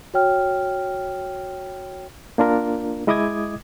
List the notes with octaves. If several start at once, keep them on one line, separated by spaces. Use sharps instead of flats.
F#4 C#5 G5 F6
A#3 D4 F4 A#4
G#3 E4 D#5 D6 D#6 G#6